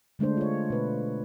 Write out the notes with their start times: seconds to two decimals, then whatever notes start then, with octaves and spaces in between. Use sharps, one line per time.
0.19 D3 G#3 A3 D4 C5
0.37 F4 C#5
0.70 B2 B4 C5